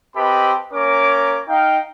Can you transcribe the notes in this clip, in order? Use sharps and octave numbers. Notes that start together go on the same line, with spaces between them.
C4 G4 A4 B4 D#5 B5
A#3 C#4 A#4 D6
D#4 F5 G5